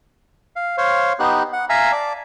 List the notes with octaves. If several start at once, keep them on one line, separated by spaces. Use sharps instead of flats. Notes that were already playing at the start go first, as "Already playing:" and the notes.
F5
C5 C#5 F5
B3 D#4 G4 F#6
F#5
E5 F5 G#5 A#5 E6
D5 A5